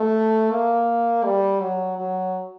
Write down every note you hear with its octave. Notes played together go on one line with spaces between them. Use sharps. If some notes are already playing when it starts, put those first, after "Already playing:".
Already playing: A3
A#3
G3
F#3
F#3